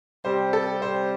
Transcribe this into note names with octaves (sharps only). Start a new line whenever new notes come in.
C3 G3 C4 C5
A4
C5